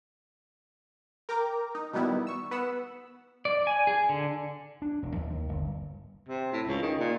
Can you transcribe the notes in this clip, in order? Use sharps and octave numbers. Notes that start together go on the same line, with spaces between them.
A#4 G5 A#5 D6
D#4
B2 D#3 G3 B3 E4
C#6 E6
B3 F#5 E6
D5
G#5
G#4
D3
D4
E1
D#2
G1
C3
A2
C#2
D#3
A#2